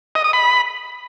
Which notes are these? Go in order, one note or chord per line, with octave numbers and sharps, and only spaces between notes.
D#5
D#6
B5